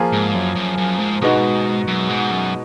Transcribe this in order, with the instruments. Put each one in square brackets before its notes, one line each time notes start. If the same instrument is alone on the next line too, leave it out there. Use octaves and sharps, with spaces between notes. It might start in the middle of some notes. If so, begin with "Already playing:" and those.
Already playing: [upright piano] F3 A#3 F4 G#4
[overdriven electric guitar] G#2
F#2
F#2
F#2
G#2
[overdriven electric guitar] G#2 [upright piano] B2 G#3 B3 D#4 F#4
[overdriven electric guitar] F#2
G#2
F#2